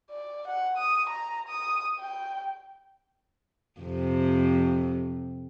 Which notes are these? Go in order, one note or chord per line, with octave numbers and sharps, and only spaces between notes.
D5
F#5
D#6
A#5
D#6
G5
F2 C3